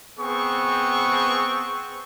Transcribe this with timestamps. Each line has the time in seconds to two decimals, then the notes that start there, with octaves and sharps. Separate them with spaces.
0.19 B3 C4 G#4 C#6